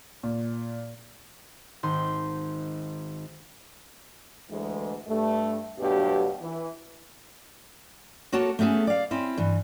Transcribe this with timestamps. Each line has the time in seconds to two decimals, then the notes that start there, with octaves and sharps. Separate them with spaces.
0.23 A#2
1.83 G#1 D#4 C6
4.50 D2 E3 G#3
5.07 G2 A3
5.79 D2 G2 B2 F#3 G4
6.41 E3
8.32 A#3 F#4 A4 C#5 F#5 A5
8.59 A3 B3 C#4 G#4 A4
8.87 D5 F5
9.11 C4 C#4 E4
9.37 G2 E3